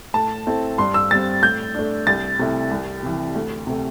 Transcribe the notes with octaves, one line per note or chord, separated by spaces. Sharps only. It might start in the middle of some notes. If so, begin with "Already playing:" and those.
A2 A5
A3 C4 E4
G2 C6
E6
G3 C4 A6
A2 G6
A3 D4
C2 A6
C3 A3 E4
C2
C3 E3
D2
C3 A3